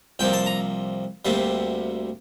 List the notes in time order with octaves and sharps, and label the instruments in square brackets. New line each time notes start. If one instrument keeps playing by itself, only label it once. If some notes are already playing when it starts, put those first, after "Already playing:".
[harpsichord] C2 C3 F3 A#3 G5
A5
A#5
D2 C3 G3 A#3